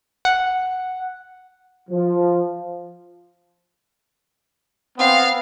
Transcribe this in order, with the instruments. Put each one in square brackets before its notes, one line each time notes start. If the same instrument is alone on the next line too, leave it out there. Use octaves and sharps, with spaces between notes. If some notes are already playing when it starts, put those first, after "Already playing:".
[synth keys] F#5
[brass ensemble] F3
[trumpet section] B3 C4 [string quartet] F5